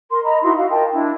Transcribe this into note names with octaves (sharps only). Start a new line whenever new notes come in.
A#4 C6
D#5 A#5 B5
D#4 E4 F#4 C6
F#4 F5
A#4 D#5 G5 A5
D4 E4